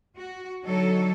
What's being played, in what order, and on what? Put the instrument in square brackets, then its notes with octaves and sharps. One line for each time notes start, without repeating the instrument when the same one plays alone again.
[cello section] F#4
D3 F#3 D#4 A4 C#5